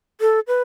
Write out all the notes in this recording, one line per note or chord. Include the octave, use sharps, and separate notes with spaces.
A4
B4